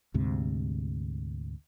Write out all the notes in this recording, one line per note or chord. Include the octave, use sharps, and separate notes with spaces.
D2 G#2 C3